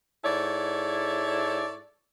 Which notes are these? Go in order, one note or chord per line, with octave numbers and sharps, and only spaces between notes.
G#2 E4 A4 C#5 D5